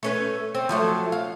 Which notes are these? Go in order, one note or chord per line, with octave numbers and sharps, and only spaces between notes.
A3 C#4 B4
C4
F3 F#3 A3
F5